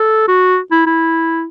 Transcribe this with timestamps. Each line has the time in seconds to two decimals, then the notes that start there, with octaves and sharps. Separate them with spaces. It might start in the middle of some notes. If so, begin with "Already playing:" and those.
Already playing: A4
0.28 F#4
0.72 E4
0.86 E4